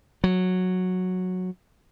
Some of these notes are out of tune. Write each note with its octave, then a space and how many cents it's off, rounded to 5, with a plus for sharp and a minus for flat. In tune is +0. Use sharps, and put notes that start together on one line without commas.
F#3 -10